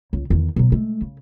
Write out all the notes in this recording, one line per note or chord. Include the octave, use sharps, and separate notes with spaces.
C#2
E2 D#3
B2 F#3
G#3 A3
C#3